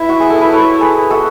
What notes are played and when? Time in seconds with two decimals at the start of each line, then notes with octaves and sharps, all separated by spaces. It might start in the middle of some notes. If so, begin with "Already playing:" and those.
Already playing: E4 B4
0.09 F#4
0.20 G#4
0.30 A4
0.41 B4
0.52 A4 C#5
0.81 G#4 B4
1.10 F#4 A4